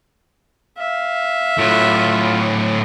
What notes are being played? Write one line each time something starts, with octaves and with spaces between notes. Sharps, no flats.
E5 F5
A2 F#3 F4